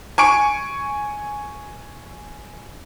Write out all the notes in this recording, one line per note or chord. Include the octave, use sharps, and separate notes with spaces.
G#5 C#6 D7